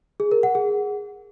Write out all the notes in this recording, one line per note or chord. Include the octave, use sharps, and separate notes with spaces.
G#4
A#4
F#5
G#4